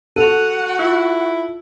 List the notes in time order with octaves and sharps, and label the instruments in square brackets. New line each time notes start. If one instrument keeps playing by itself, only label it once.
[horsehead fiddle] F#4 F#5 [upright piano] A4 [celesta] D#7 F7
[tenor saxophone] E4 [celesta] F4